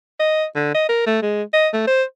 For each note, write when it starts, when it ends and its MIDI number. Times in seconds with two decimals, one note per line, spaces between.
0.20 0.45 75
0.56 0.70 50
0.75 0.89 75
0.89 1.03 70
1.07 1.19 57
1.22 1.43 56
1.54 1.68 75
1.73 1.84 57
1.87 2.03 72